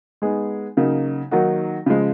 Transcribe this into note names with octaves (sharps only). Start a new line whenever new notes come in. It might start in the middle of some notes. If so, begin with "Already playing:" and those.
G#3 B3 D#4 G#4
C#3 F#3 A#3 D#4
D#3 F#3 A#3 D#4 F#4
C#3 F3 G#3